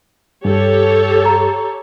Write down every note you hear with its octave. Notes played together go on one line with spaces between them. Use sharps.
G2 G4 A4 C#5
A#5